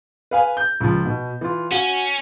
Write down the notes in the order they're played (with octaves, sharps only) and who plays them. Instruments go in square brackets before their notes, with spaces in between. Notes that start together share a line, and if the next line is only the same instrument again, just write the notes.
[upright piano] B4 F5 G#5
G6
C#2 F3
B2
E3 F4
[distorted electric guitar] C#4 [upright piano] F#4